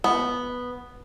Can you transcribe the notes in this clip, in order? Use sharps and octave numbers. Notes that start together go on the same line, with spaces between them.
B3